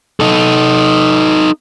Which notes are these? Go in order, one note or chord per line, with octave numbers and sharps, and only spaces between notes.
D#4 A4